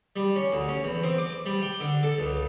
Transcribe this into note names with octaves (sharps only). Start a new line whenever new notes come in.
G3
C#4
D2
C#4
E2
C4
D6
G3
G5
D3
A4
C#2